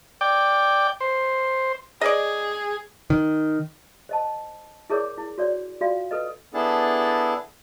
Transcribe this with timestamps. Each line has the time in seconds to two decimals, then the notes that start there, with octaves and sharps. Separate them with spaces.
0.21 D5 G5
1.00 C5
2.01 G#4 D5 D#5
3.10 D#3
4.09 C5 D#5 A5
4.90 E4 G#4 A#4 C#5 D5 D6
5.17 E4
5.38 F#4 C#5 D5
5.81 F4 F#4 D5 F5
6.11 A4 B4 D#5
6.54 B3 D4 E4 G#4 A4 A5